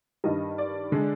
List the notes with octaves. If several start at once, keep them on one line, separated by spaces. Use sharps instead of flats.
G2 D#3 G3 D#5
D5
D3 G#3